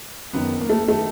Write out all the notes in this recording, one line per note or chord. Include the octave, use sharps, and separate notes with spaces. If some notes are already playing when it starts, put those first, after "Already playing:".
F#1 F#2 D#3 B3
A#3
A3
D#3 A3